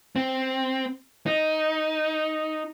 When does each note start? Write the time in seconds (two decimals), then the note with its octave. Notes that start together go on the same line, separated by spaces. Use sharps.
0.16 C4
1.26 D#4